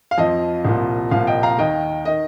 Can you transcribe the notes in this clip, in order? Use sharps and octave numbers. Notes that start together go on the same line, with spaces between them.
F5
F2 F3 D#5
C2 A#2 F3
C2 A#2 F3 F5
D#5 G5
F5 A#5
D#2 D#3 D#5 G5
D#3 D#5